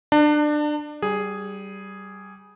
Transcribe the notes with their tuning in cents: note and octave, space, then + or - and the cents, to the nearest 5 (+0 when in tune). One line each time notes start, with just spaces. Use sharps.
D4 +25 A5 +40
G3 -20 G#4 +0